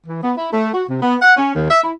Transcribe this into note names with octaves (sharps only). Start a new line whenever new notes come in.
E3
B3
E4
A3
F#4
C3
B3
F#5
C#4
D#2
E5
E4